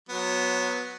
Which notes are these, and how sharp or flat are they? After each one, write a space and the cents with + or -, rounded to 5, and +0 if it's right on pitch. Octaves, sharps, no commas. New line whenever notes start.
F#3 -15 B3 +0